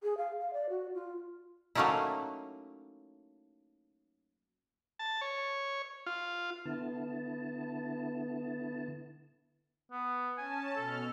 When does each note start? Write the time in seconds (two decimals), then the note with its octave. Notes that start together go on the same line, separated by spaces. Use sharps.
0.03 G#4
0.17 F5
0.40 F5
0.53 D5
0.69 F#4
0.94 F4
1.75 F#3 A3 A#3 C#4 D#4 E4
4.99 A5
5.21 C#5
6.06 F4
6.65 D3 B3 E4 A5
9.92 B3
10.38 C#4 G#5 A5
10.76 B2 A4 F6